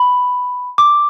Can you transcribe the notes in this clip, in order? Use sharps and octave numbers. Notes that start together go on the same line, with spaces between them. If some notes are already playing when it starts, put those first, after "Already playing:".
Already playing: B5
D6